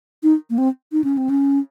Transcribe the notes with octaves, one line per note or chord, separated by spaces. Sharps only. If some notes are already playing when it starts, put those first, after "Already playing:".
D#4
A#3
C4
D#4
C#4
C4
C#4